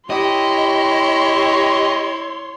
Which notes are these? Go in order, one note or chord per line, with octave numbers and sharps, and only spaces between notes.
E4 G4 C#5 D#5 C6